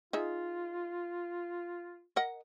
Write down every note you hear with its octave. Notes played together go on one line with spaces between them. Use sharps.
D#4 F4 G#4 E5
A#4 D#5 F#5